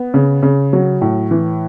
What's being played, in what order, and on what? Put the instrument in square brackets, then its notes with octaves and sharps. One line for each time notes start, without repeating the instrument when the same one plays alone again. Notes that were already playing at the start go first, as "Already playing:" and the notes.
Already playing: [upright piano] B3
C#3
C#3
F#3
A2
E3